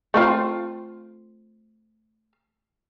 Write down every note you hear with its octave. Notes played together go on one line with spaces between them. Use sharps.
A3 C4 F4